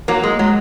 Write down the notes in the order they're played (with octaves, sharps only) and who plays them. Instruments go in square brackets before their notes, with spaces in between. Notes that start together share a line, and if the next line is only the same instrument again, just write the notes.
[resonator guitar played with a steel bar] F#3 A#3
G#3
[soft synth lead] A#3
[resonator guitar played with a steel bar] F#3 [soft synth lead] G#3